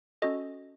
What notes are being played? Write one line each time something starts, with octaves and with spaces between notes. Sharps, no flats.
C#4 F#4 A4 D#5